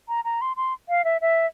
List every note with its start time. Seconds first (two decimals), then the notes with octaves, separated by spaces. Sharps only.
0.08 A#5
0.25 A#5
0.41 C6
0.57 C6
0.89 F5
1.04 E5
1.21 E5